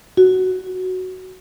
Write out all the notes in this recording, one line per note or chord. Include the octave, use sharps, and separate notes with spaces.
F#4